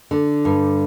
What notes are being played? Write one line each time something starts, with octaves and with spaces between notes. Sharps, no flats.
D3
G2